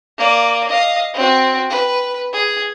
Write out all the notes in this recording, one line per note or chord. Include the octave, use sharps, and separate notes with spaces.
A#3 D5
D#5 F5
C4 F#4
B4
G#4